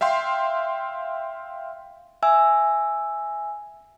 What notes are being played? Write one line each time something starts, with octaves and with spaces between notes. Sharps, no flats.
E5 F5 G5 C6
E5 G#5 E6